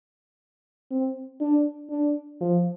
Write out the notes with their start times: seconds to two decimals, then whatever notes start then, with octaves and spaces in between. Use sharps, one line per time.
0.91 C4
1.41 D4
1.90 D4
2.41 F3